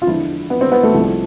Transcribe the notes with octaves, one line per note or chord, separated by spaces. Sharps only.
F4
E2 D3 F3 G#3 E4
B3
C4
B3
A3
C2 C3 F3 G#3